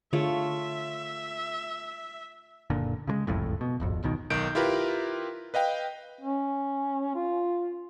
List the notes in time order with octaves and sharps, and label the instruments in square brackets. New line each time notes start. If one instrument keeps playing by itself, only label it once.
[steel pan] D3 G#4 [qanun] A3 F4 C#5 [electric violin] E5
[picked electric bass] F#1 A#2 D3
C#3 F3 G#3
F#1 C2 F2 A2
B2
D1 G#1 F2
D1 B1 B2 D#3
[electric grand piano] B1 D#3 G6 D7
E4 F4 G4 A#4 B4
B4 D#5 F5 G5
[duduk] C#4
F4